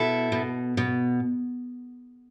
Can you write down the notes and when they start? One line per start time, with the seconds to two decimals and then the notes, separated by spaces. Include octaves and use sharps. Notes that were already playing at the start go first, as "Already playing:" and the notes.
Already playing: B2 E4 A4
0.32 B2
0.77 B2